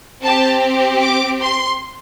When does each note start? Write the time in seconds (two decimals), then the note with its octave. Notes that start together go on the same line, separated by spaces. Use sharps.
0.22 C4 G4 A5
1.01 D6
1.40 C6